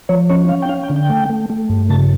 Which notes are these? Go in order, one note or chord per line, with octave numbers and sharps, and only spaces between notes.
F3 C#5
C#4 C#5
C#4 F5
G5
C#4 F5
G5
D3
G5
A3
A3
A3
G2
C#3 A5